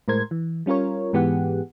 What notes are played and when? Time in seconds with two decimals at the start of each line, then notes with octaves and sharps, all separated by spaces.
0.08 A2 G#3 A#4 C5 G#6
0.31 E3
0.66 G3 C#4 F4 A#4 C#5
1.13 G#2 E3 B3 G4 G#4 F#5